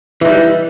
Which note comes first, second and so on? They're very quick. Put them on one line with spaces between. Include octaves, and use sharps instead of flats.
E3 D#4 G3